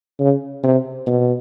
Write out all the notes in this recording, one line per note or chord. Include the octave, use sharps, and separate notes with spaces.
C#3
C3
B2